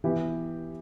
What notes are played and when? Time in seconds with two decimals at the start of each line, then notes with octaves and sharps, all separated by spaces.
0.04 E3 B3 E4 G4